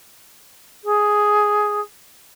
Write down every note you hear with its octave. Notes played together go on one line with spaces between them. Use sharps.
G#4